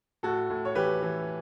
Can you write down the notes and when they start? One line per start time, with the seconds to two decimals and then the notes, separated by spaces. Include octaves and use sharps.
0.23 A2 F#4 A4
0.50 A2
0.65 C#5
0.75 E3 G4 B4
1.02 E3